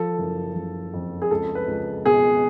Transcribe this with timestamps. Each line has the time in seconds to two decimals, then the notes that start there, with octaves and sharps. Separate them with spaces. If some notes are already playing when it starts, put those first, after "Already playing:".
Already playing: F3 A4
0.18 F#1
0.55 F#1
0.94 F2
1.22 G#4
1.31 C#2 A4
1.55 B4
1.67 C#2
2.06 B2 G#4